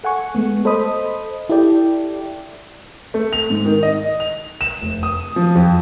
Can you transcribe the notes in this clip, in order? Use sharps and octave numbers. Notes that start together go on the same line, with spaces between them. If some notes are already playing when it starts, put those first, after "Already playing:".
A4 F#5 G#5 C#6
G#3 A3 B3
A4 C5 D#5 B5 D#6
E4 G4 A4 D5 G5
A3
F7
G#2
D#3
D#5
F7
E7
F1
D#6
F3
F2